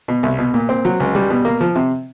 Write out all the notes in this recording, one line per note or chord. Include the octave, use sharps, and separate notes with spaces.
B2
C2
B2
A#2
C4
F#3
C#2
G3
B2
A#3
F3
C3